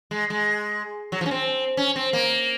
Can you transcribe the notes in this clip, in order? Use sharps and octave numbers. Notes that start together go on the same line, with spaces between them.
G#3
G#3
F#3
F3
C#4
C4
C#4
C4
A#3